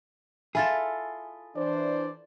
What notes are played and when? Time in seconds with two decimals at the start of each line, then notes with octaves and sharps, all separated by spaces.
0.55 E4 F4 G#4 A4
1.56 E3 D4 C5 D5